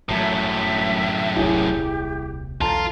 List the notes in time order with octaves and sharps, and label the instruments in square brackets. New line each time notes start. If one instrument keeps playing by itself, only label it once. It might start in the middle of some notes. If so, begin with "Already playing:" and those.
[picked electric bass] G1 F#3 A3 [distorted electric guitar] F#2 A2 [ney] E5
[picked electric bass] D#1 C2 [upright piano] E4 G#4 C#5 [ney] G4
[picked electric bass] B1 E2 D3 [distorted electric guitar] F4 [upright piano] A4 A5 [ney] A#5